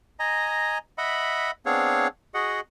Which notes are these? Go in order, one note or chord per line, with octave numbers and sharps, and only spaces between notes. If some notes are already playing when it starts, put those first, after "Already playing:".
D#5 G#5 A#5
D#5 E5 F#5 B5
B3 C4 D4 G#4 C#5 F5
F#4 G#4 D#5 F#5